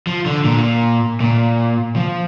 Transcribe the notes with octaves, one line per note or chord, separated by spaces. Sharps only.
F3
D3
A#2
A#2
F3